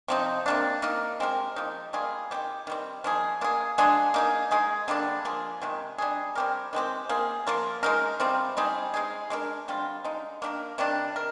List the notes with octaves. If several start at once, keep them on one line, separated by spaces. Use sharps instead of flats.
C3 F3 C4 D#4
C3 D#3 A#3 D4
A#3 D#4 A#4
G#3 C4 G4 A#4
F3 A#3 D#4
G3 A#3 F4 G#4
D#3 G3 C4 G4
D#3 G3 C4
F3 A#3 D#4 G#4
A#3 F4 G#4
F3 G#3 D4 G#4
A#3 D#4 G#4
G#3 D#4 G#4
D3 G3 A#3 D4
F3 A#3 F4 G#4
C3 D#3 G#3
G3 D4 G#4
G3 C4 G4 A#4
D#3 G#3 C4 G4
A#3 F4 G#4
F3 A#3 F4 A#4
G#3 D#4 A#4
C3 G3 C4 F4
G3 C4 D#4 G#4
G#3 D#4 G#4
G#3 D4 G4 A#4
D3 G3 C4 F4
D3 G#3 D#4
A#3 D4 G4 A#4
C3 D#3 G3 D4
A#4